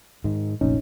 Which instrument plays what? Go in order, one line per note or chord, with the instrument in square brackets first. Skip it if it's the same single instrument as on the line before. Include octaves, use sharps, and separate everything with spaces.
[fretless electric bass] G#2 D#3
[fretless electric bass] F1 A#1 [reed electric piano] C#4 D#4